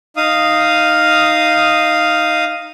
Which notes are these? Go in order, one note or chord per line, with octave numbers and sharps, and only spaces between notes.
D#4 F5 D#6